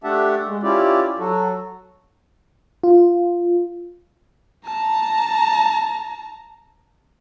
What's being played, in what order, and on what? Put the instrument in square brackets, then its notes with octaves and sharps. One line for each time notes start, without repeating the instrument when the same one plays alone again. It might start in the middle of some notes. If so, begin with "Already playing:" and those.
[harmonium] A3 D4 G4 E5 F#5 A5
G#3
C#4 E4 F4 G4 D5
F#3 F#4 A4
[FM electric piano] F4
[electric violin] A5 A#5